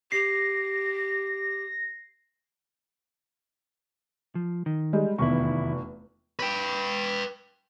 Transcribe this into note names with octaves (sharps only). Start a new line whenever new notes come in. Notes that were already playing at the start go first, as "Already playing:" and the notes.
G4 A#6 C7
F3
D#3
G3 G#3
F1 E2 D#3 E4 C#6
B4 G5